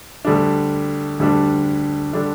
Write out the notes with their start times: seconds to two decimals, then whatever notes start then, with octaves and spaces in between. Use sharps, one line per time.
0.25 D2 D3 G3 D4
1.19 D2 D3 G3 D4
2.13 D3 G3 D4